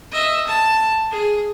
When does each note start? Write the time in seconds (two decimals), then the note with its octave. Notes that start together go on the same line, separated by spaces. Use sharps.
0.12 D#5 E5
0.47 A5
1.11 G#4